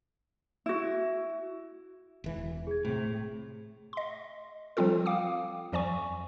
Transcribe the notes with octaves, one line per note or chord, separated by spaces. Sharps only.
E4 F#4
E1 E3
G#4 G#6
A2 C3
D#5 C6
F3 G3 C4 F4 A4
F5 G5 D6 D#6
F2 F3 D5 G#5 C#6